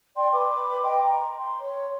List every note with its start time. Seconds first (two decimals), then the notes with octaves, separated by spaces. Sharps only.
0.16 D5 G5 C6
0.32 B4 B5 D6
0.81 D#5 G5 C6
1.01 A#5
1.38 C6
1.60 C#5